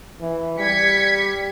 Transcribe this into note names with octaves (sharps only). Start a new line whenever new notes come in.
E3
G3 G#6 B6 C#7